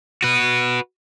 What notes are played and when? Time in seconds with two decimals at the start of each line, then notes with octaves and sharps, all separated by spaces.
0.23 F#4 B4